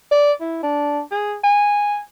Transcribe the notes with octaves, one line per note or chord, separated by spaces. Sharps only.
D5
E4
D4
G#4
G#5